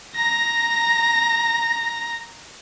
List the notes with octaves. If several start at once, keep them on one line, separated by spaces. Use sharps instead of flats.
A#5 A#6